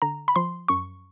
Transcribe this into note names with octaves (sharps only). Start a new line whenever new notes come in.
D3 A#5
B5
F3 C6
F#2 C#6